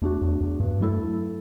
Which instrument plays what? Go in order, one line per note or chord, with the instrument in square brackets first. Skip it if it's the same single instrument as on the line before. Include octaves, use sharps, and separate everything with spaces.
[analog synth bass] E2 [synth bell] A3 D4 F#4
[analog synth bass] E2
E2
G2
[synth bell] F#3 A3 E4 A4